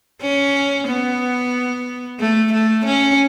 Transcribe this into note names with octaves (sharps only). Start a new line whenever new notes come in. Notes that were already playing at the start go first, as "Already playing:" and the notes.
C#4
B3
A3
A3
C#4